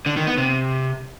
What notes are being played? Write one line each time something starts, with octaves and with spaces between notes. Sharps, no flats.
D3
D#3
B3
C3